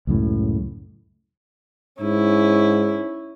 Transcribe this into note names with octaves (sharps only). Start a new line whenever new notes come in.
C#2 F#2 A2
G#2 C#4 E4